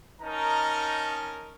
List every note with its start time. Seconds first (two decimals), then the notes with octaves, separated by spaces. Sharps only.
0.22 C#4 D#4 A#4 D#5 A5 A#5